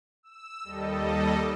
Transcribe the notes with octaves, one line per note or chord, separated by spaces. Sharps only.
E6
D#2 G3 A4 D#5